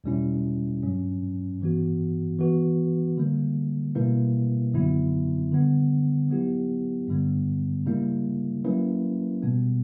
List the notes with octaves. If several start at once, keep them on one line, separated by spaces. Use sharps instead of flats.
E2 B2 G3 C#4 E4
G2 F#3 C#4
G2 E3 B3 F#4
E3 B3 F#4 B4
D3 G3 A#3
B2 G3 A#3 E4 B4
F#2 D3 F#3 B3 E4
D3 G3 B3
F#3 B3 E4 G4
G2 D3 G3 B3
C#3 G3 A#3 E4
F#3 A#3 C#4 E4 B4
B2 G3 B3